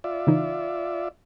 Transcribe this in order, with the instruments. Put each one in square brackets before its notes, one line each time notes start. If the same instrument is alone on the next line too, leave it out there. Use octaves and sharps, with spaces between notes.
[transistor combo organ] F4 D5 E5
[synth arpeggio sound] C#3 E3 D#4